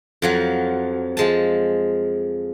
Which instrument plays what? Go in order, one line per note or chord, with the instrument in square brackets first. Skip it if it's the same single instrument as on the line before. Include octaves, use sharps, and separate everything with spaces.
[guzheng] F2 F3 F#3
F3 G#3 A5